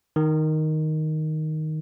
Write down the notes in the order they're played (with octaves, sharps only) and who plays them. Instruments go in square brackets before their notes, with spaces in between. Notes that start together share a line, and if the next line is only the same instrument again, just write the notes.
[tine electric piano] D#3